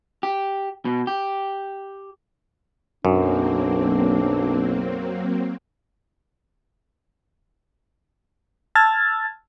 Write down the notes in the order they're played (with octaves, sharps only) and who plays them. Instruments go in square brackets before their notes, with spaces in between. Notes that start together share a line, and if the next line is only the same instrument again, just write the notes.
[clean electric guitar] G4
B2
G4
[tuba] B1 [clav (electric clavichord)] F#2 [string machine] F#3 A#3 C4 [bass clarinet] D4
[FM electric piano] A5 E6 F6 G#6 A6